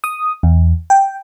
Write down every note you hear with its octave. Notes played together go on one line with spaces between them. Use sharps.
D#6
E2
G5